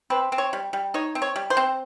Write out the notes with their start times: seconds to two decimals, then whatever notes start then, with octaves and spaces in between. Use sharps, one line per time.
0.10 C4 B4
0.32 C4
0.38 C#5
0.53 G3
0.73 G3
0.94 D#4 C#5
1.15 C4
1.22 C#5
1.36 G3
1.50 C5
1.57 C4